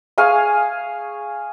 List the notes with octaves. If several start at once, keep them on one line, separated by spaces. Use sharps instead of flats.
G#4 F5 G#5 C#6